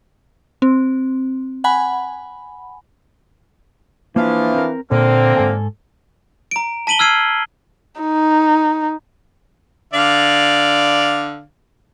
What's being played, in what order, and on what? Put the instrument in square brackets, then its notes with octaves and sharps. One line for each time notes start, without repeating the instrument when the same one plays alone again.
[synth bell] C4
F#5 G#5 B5
[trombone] E3 [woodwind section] F3 D4 F5 [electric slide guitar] A#3 E5
[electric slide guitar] C4 A#4
[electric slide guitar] A#2 [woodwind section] D3 A#3 [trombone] C4
[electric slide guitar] G#2 A4 G#5
[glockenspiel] A#5 D7
A5 B6 D#7 F#7 G7
E6 F6 G#6 C7 D#7
[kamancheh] D#4
[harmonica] D3 D5 F5